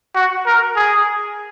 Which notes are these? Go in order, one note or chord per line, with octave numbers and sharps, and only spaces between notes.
F#4
A#4
G#4